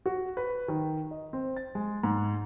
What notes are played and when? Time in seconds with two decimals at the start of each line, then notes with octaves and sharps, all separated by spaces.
0.06 F#4
0.37 B4
0.68 D#3
1.11 D#5
1.33 C4
1.56 A6
1.75 G#3
2.04 G#2